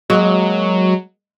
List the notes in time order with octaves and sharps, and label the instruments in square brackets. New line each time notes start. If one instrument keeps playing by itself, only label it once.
[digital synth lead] F#3 [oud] G#3 A#3 F#4